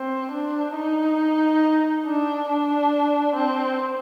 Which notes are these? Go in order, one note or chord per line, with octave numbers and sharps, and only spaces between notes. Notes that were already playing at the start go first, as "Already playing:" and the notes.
Already playing: C4
D4
D#4
D4
D4
C4